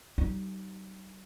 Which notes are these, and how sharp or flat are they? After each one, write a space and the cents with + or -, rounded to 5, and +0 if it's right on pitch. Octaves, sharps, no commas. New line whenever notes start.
G3 -40 D#4 -15